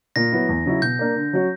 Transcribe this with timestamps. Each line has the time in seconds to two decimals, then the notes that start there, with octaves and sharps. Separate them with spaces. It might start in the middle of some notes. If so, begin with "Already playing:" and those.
0.16 A#2 A#6
0.32 F#3 B3 E4
0.49 E2
0.66 C#3 F#3 C#4 E4
0.82 B2 G6
0.99 A#3 D4 A#4
1.16 D3
1.33 F#3 C#4 F#4